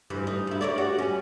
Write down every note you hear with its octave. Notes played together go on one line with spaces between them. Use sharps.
D2 G2 E3
D#4
D2 E4
A#4 C#5 D5
F#4 G4
G3 C#4